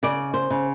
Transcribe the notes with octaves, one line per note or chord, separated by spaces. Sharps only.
C#3 D5
C5
C#3